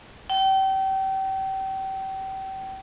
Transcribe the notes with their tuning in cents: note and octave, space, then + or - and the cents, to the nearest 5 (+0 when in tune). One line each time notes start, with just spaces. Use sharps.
G5 -35